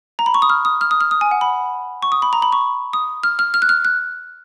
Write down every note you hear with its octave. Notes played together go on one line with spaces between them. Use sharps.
A#5
B5
C#6
D#6
F6
D#6
F6
D#6
F6
D#6
G#5
F#5
B5
C#6
D#6
B5
A#5
B5
C#6
D#6
F6
F6
F6
F#6
F6
F#6